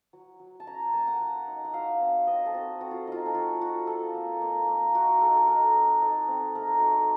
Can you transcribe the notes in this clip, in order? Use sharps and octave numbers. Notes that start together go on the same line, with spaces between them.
F#3
F#3
A5
C#4 A#5
A5
A#3 A5
F#5
F#3
D#4
F#5
F#3 F5
C4
C4 D#5
A4
C4 F#4
C4 F#4
F4
D#4 F4
A4
F4 F#4
F4 F#4
F4 A4
A#3
A#3
A#3
D#4 F#4
D#4 A4
A4
D#4 A#4
C4
D#4 A4
C4
A3 A#4
A4
D#4 F#4
A4